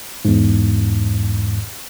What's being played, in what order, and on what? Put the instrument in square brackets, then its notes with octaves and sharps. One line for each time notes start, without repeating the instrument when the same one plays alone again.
[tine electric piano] E2 G#2